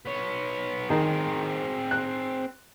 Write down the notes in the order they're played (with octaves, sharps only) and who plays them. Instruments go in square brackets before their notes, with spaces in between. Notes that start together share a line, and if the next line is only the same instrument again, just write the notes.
[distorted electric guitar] B3 C#5
[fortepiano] D#3 [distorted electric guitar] C4 G#4
[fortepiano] F#6